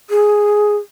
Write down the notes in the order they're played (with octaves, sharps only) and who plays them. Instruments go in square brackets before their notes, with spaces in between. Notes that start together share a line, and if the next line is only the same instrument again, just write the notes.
[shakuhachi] G#4